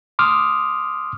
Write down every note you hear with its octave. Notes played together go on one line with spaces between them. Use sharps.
C6 D6 D#6 F6